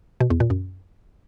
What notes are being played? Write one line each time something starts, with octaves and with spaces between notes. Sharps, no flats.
B2
E2
A#2
F#2